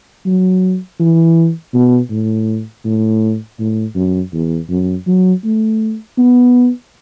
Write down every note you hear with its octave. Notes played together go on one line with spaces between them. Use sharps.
F#3
E3
B2
A2
A2
A2
F#2
E2
F#2
F#3
A3
B3